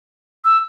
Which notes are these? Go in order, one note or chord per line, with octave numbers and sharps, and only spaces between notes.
E6